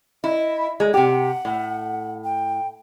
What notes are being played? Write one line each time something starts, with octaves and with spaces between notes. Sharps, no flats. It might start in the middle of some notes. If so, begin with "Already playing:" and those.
E4 D#5
G#3
C3 G4 F#5
A2
G5